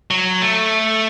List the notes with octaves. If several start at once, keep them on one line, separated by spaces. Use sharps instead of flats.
F#3
A3